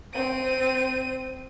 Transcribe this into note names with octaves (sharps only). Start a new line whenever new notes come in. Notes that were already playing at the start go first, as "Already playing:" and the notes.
C4 D#7